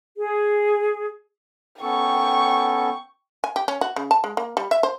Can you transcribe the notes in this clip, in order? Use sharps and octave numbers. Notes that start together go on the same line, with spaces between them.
G#4
B3 C#4 A4 G5 C#6
G#5
G4
C#4
F#4
C#3
A5
G#3
A#3
G3
E5
C5